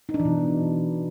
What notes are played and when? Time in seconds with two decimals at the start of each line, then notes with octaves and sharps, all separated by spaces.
0.09 D#4
0.14 D4
0.20 E3
0.25 B2